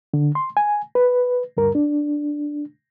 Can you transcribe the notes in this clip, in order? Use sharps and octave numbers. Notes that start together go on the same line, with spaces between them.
D3
C6
G#5
B4
D2 G2 A#4
D4